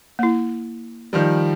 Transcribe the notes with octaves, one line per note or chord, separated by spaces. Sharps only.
A#3 E4
D#3 F3 G3